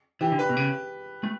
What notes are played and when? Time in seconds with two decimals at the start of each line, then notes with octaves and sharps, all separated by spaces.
0.21 E3 G4
0.32 D3
0.39 B4
0.49 B2
0.57 C#3
1.23 A3